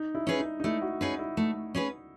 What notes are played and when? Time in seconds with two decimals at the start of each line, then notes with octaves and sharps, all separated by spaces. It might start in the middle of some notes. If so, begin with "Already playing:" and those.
Already playing: D#4
0.15 E4
0.27 C#4 G#4 B4
0.40 D#4
0.60 D#4
0.64 A3 E4
0.82 F#4
1.01 C#4 D#4 G#4 B4
1.19 E4
1.37 A3
1.75 C#4 G#4 B4